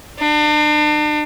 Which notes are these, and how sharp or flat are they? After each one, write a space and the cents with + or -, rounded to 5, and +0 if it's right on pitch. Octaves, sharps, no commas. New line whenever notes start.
D4 +40